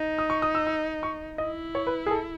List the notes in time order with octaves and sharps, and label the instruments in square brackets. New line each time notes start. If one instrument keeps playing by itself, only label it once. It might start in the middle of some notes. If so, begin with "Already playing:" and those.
Already playing: [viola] D#4
[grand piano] D#6
C#6
D#6
E6
E6
C#6
[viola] E4 [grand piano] D#5
[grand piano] C#5
B4
G#4
A4